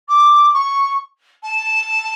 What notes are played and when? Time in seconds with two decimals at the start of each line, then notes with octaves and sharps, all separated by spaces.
0.08 D6
0.54 C#6
1.43 A5